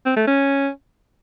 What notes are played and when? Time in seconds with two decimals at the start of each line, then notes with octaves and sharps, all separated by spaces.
0.06 C4
0.17 A3
0.27 C#4